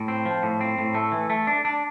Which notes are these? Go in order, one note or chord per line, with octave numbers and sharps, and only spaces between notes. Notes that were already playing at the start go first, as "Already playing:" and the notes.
Already playing: A2
C4
F3
A2
C4
A2
A3
E3
A3
D4
D4